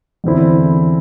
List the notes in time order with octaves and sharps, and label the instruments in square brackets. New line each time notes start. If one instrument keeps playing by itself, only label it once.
[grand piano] E2 D3 C4 E4